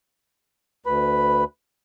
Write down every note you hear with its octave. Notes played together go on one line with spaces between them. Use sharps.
D2 B4 B5